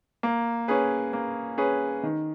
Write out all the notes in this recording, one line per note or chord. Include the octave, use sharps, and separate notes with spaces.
A#3
C#4 G#4 B4
A#3
C#4 G#4 B4
D#3